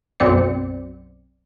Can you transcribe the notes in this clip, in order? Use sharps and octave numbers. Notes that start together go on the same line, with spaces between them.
B1 F#2 C4 D5 C#7